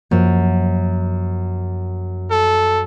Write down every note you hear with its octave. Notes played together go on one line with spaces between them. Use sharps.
F#2 F3 A#3
A4